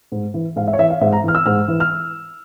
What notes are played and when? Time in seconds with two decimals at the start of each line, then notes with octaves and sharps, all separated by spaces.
0.12 G#2
0.34 E3
0.56 G#2 F5
0.68 E5
0.73 C#5
0.79 E3 E5
0.90 F5
1.01 G#2 E5
1.12 A#5
1.24 E3 F6
1.35 E6
1.46 G#2 F6
1.68 E3
1.80 F6